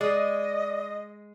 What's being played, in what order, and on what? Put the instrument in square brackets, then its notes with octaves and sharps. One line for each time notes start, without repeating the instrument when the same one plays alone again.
[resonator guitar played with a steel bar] G#3 [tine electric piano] D5 D#6 [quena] D#5